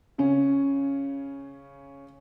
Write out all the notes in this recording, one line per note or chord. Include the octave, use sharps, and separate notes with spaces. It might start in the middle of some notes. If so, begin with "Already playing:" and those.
C#3 C#4